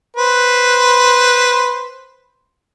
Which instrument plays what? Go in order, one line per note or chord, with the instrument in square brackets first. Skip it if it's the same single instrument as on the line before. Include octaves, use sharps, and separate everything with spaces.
[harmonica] B4 C5